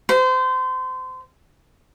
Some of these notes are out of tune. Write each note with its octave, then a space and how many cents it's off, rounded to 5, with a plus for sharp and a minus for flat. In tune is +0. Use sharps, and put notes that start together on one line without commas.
C5 -30